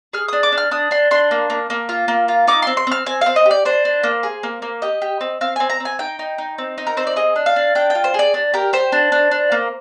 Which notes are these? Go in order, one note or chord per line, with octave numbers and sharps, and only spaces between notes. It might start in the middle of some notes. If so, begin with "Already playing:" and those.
G#4 F6
D4 D#6
D6
D4
F6
D4 D#6
D4 C6
D4 C6
A#3
A#3
A#3
F4
A#3
F4
D#4 D6
C4 C6
C6
C4 F6
C4 G#5
C4 F5
D#5
G4
D5
D4 C5
D4
A#3
G#4
A#3
A#3
G4 D#5
G4
C4
C4 F5
C4 G#5
A#5
C4
G#5
D#4 G5
D#4
D#4
C4
D#4
A#4
C4 C5
D5
G#4 D#5
D4
F5
D4
D4 G5
F4 G5
C5
G#4 D5
D4
G4 A#4
G4 C5
D4
D4
D4
A#3